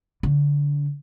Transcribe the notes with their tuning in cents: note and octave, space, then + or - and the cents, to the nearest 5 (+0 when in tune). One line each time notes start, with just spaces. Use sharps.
D3 -25